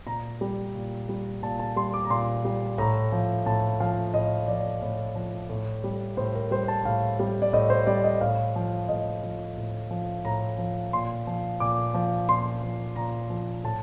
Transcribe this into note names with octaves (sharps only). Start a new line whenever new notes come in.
A#2 A#5
G3
A#2
G3
A#2 A5
A5
G3 C6
D6
A#5
A#2 C6
G3
A2 A#5
F3
A2 A5
F3 F5
A2 D#5
F3 D5
A2
F3
A2
G3
A2 C5
A#4
G3 C5
A5
A2 F5
G3
D5
A2 D#5
C5
G3 D5
D#5
A2 F5
F3
A2 D#5
F3
A2
F3
A2 A#5
F3
A#2 C6
F3
A#2 D6
F3
A#2 C6
F3
A#2 A#5
F3
A2 A5